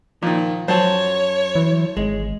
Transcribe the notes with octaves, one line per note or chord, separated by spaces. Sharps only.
A#2 D#3 F3
F#2 F#3 F#4 C5 C#5 A5
E3
G#1 G#3